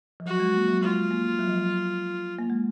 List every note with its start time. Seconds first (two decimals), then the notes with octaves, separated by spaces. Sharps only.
0.20 F3
0.26 F#3 F#4
0.40 G#3
0.54 A#3
0.68 F#3
0.82 G#3 F4
1.11 A#3
1.39 F#3
1.48 F3
1.58 F#3
2.39 A#3
2.50 G#3